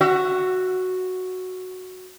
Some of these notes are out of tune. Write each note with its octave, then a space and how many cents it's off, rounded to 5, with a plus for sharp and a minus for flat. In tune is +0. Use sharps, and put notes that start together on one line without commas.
F#4 +0 E5 +25